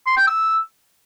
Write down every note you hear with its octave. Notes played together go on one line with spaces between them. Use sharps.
C6
G5
E6